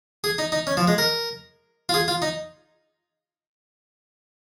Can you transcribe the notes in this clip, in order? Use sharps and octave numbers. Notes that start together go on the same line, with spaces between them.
G#4
D#4
D#4
C#4
F3
G#3
A#4
F4
G#4
F4
D#4